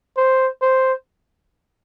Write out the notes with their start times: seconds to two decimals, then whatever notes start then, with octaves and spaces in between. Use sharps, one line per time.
0.17 C5
0.62 C5